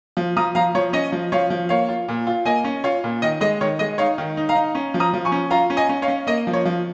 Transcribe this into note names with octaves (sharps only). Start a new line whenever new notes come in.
F3
F3 A#5 D#6
F3 F5 A#5
F3 C#5
C#4 D#5
F3
F3 C#5 F5
F3
A#3 C#5 F5
F4
A#2
F4
A#3 D#5 G#5
C#4
F4 C#5 F5
A#2
D#3 D#5
G#3 D#5
D#3 C#5
G#3 D#5
D#4 C#5 F5
D#3
D#4
F5 A#5
D#4
C#4
F3
A#5 D#6
F3
G#5 C#6
C#4
F4 F5 A#5
C#4
D#5 G#5
C#4
C#5 F5
C#4
A#3 D#5
F3
C#5
F3